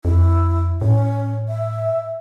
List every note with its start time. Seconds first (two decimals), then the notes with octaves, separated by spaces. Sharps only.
0.05 F2 E4
0.81 A2 C#4
1.49 E5